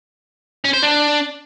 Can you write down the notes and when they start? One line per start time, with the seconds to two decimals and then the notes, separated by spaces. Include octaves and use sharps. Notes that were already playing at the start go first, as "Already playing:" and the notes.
0.64 C#4
0.73 C5
0.82 D4